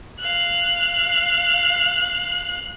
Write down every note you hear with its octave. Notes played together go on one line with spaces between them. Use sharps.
F5 F#6